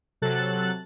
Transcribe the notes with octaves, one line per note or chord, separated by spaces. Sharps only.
C3 F#3 A4 F#6 A6